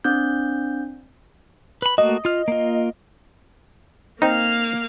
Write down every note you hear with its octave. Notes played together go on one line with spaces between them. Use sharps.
C4 D4 G6
B4 B5
A3 A#3 F#4 D#5
F4 F6
A#3 F4
A#3 C4 D#4 F5